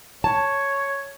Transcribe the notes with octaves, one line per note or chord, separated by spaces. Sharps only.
C#5 A5